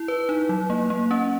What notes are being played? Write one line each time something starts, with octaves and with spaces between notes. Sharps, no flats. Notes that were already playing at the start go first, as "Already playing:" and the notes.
Already playing: E4
B4
D#4
F#3
A#3
A#3
C#4